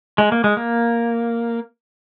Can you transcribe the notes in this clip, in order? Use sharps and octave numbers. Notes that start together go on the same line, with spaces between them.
G#3
A#3
G#3
A#3